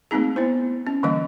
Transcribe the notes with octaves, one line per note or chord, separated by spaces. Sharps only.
A3 A#3 C4 D#4 G#4
B3 E4 C5
C#4
D3 E3 G3 A#3 D#5